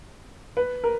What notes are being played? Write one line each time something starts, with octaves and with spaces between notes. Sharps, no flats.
B4
A#4